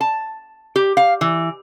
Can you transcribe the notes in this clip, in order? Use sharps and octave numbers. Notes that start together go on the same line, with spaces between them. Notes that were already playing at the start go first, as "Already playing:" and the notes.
A5
G4
F5
E3